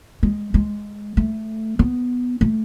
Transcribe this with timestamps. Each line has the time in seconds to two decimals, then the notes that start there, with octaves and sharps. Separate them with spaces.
0.23 G#3
0.54 G#3
1.17 A3
1.79 B3
2.41 A3